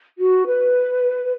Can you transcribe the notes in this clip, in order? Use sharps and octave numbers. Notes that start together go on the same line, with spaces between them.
F#4
B4